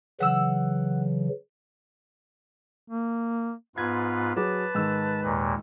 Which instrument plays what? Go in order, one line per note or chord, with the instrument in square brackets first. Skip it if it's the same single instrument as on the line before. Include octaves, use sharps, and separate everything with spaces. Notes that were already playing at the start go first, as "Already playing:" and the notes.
[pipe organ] C#3 E3 F#3 [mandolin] F#5 E6
[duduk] A#3
[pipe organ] G#2 F4 B4 [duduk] B3 [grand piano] C6 G#6
[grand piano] F#3 G#4 D6 [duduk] B4 [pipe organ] A5
[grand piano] G#2 D#3 E6
[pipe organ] D#2 A#2